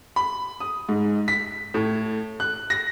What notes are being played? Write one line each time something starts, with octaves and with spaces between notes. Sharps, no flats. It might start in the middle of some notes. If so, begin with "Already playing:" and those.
B5
D#6
G#2
B6
A2
F#6
A#6